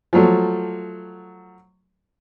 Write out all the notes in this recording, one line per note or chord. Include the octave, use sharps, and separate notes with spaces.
F3 F#3 A3